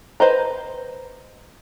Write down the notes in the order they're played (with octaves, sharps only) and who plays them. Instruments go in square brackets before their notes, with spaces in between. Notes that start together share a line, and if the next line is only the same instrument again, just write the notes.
[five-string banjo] B4 C5 D#5 A#5